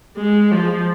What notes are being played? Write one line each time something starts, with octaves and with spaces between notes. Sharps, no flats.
G#3
F3